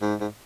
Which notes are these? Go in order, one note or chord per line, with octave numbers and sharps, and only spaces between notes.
G#2
G#2